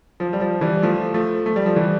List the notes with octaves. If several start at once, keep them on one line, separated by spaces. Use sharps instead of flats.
F3
G3
F3
E3 G3
F3 A3
F3 A3
A3
G3
F3
E3 G3